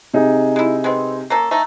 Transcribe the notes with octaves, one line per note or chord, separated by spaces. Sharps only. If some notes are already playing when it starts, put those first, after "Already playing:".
C3 D#4 G#4
G#3 E4
G#3 B3 C4
A#3 C#4 A4
A3 D#4